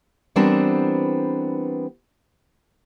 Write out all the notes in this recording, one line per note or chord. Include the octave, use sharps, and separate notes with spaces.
E3 G3 B3 C4 D4 A#4